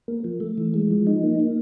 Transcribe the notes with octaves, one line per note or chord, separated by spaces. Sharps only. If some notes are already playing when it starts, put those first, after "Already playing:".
A#3
F3
A3
E3
G#3
F3
D#4
A#3
A#3